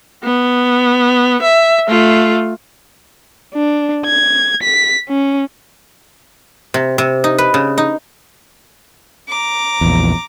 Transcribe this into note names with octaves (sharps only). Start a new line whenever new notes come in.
B3
E5
A3 F4
D4
G#6
B6
C#4
C3
C3
D#4
B4
C#3
D#4
A#5 D6
A#1 E2